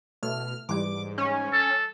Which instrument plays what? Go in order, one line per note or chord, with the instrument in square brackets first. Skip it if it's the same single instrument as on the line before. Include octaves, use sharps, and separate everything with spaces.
[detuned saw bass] B2 [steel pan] A3 [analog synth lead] F6
[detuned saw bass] G#2 [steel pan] E3 G3 [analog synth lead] D6
[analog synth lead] C#4
[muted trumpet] A4